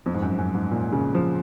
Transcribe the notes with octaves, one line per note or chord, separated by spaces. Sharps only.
F2
G#2
F#2
F#2
G#2
A#2
C#3
F3